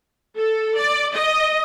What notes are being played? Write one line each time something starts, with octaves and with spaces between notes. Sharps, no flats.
A4
D5
D#5